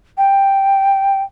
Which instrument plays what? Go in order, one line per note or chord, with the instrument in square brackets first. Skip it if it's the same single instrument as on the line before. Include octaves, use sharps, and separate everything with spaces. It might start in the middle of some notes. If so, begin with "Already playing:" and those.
[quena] G5